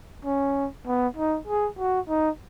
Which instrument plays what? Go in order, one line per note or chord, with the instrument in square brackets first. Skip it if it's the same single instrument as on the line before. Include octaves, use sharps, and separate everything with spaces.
[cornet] C#4
B3
D#4
G#4
F#4
D#4